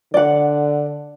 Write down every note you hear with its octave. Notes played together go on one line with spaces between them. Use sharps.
D3 D5 F#5